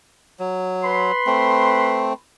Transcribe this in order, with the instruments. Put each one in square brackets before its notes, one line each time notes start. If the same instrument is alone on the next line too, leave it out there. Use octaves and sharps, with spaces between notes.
[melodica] F#3
[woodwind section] B4 B5 C6
[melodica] A3 C4